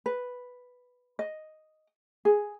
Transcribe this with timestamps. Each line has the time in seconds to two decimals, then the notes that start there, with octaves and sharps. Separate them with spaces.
0.06 B4
1.19 D#5
2.25 G#4